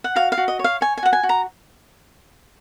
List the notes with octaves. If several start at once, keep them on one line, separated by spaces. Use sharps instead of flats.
F#5
F#4 F5
F5
F#4
D#5
C#5
F5
C#5 G#5
G#5
F#4 F#5
G#5
F#4
A#5